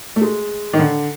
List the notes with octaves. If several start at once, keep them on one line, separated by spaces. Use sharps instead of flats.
A3
G#3
D#3
D3